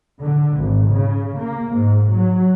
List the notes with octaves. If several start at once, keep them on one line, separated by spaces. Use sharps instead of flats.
D3
G#1
C#3
A#3
G#2
F#3